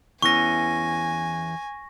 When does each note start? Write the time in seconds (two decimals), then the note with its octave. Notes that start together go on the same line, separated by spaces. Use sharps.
0.22 E2 E3 C#4 G#5 C#6 A#6